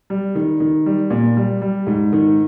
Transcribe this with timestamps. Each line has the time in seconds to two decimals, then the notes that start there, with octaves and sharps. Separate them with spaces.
0.10 G3
0.35 D#3
0.60 D#3
0.86 G3
1.10 A#2
1.37 G3
1.62 G3
1.87 G#2
2.13 D#3